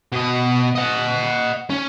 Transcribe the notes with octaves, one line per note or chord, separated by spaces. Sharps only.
B2 D#5
D#5 F#5
C#4